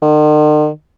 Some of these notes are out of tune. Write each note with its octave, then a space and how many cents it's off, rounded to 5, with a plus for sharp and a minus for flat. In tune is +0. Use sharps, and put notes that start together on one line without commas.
D#3 -45